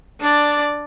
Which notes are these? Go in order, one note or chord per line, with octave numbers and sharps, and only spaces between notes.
D4 D5